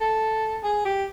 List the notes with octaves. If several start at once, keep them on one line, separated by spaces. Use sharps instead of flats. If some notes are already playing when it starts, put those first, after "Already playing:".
A4
G#4
G4